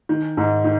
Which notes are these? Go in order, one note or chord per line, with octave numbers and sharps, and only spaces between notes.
D#3
G#2
D#3